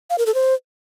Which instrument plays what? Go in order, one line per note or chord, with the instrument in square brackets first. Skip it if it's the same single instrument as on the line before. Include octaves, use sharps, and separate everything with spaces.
[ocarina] F5
A#4
A4
C5